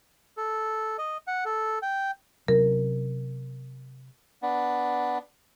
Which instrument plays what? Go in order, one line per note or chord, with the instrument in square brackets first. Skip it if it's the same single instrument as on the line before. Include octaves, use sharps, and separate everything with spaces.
[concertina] A4
D#5
F#5
A4
G5
[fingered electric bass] C3 F#3 C#4 [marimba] A#4
[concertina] B3 D4